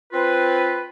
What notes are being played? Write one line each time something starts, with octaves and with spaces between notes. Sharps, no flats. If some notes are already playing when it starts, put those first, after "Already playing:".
C4 F4 B4